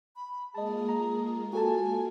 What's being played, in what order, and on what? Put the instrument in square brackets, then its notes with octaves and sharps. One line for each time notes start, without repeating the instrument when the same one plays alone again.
[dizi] B5
[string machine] G#3 A#3 F4 [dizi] G#4 [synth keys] D#5 A5
[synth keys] A#5
[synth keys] F#4 A4 A5 [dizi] G#5